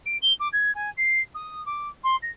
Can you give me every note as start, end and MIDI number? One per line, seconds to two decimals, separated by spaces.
0.06 0.16 98
0.22 0.33 103
0.40 0.48 86
0.53 0.74 92
0.75 0.90 80
0.97 1.20 96
1.35 1.64 87
1.66 1.89 86
2.04 2.16 84
2.22 2.30 94